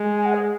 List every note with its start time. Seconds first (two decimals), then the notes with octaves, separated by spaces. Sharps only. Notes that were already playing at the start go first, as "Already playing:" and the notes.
Already playing: G#3
0.16 G#5
0.25 F#5
0.34 G#4